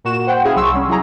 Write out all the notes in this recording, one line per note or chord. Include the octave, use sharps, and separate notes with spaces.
A#2 A#3 F#4 E7
C5 F#5 G5
C#4 E4 G#4 F5
C2 F#3 C6 C#6 E6
G3 C#4
F#3 E4 G#4 A#5